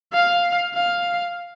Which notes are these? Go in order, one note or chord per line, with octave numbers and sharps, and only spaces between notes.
F5
F5